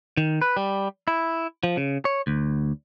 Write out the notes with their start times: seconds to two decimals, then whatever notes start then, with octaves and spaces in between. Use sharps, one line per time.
0.17 D#3
0.42 B4
0.57 G3
1.08 E4
1.63 F3
1.77 C#3
2.05 C#5
2.27 D2